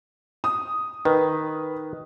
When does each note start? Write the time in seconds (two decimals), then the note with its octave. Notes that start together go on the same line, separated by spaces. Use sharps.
0.44 D#6
1.05 D#3 B4